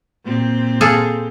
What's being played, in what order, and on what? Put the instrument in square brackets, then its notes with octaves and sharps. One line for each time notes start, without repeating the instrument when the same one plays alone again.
[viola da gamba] A#2 C4 G4
[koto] G#4 A4 F5